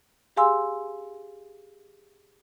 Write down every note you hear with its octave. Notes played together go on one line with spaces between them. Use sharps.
G4 G#4 F5 G#5 C6 E6